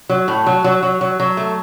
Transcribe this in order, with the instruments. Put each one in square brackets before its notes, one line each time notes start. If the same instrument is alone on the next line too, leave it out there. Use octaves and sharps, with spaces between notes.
[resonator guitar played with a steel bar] F#3
A2
F#3
F#3
F#3
F#3
F#3
A3